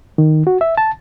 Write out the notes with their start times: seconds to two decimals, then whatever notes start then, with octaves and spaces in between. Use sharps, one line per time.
0.18 D#3
0.47 F#4
0.61 E5
0.77 A5